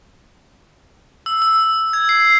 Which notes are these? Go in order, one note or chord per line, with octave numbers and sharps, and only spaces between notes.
E6
E6
G#6
C7